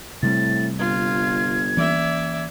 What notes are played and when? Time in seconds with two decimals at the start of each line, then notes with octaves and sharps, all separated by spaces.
0.23 A2 C3 G3 C4 A6
0.79 G1 F4 G#6
1.77 E3 A#3 C#4 D5 E5